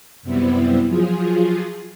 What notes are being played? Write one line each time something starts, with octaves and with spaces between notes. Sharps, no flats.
F#2 C3 G3 B3 C4 E4
F3 F#3 F4 G#4